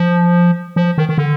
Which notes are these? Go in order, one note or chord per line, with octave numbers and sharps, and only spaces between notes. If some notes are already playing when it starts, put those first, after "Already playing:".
Already playing: F3
F3
D#3
D#3
D3